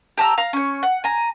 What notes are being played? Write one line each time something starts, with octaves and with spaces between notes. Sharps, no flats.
G4 A5 A#5 E6
F5 A#5 F6
C#4 C#5
F#5
G#5 A#5